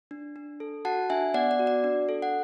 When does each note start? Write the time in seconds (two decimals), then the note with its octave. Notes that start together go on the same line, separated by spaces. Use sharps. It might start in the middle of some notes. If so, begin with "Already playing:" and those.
0.11 D4
0.36 D4
0.60 A4
0.85 F#4 F#5 A5
1.10 D4 E5 G#5
1.34 B3 D5 F#5
1.51 D5
1.59 F#4
1.67 D5
1.84 D4
2.09 A4
2.22 F#5